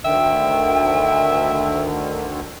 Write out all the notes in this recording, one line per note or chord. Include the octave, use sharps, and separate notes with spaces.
D2 D3 D#3 E5 G5